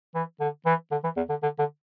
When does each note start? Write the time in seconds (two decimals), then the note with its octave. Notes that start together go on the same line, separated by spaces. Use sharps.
0.15 E3
0.40 D3
0.66 E3
0.92 D3
1.04 E3
1.17 E2
1.29 D3
1.43 D3
1.59 D3